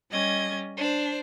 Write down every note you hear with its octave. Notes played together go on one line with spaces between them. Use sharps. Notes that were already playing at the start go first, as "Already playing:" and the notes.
G3 C#4 D#5 G#6
D4 C5